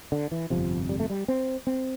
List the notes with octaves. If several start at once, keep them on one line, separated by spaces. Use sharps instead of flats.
D3
E3
G1 F2 C3 F3
G3
A3
G3
C4
C4